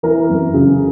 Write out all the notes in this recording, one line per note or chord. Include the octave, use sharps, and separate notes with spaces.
E3 A#4
F#2
C#3